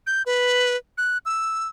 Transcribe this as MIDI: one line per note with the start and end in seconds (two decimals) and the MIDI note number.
0.07 0.22 91
0.26 0.76 71
0.98 1.18 90
1.26 1.68 88